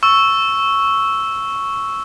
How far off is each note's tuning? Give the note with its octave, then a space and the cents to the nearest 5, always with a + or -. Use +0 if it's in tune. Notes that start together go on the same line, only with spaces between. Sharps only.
C#6 +0 E6 +0